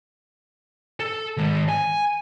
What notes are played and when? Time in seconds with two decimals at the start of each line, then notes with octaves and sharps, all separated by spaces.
1.00 A4
1.37 D#3 G#3
1.69 G#5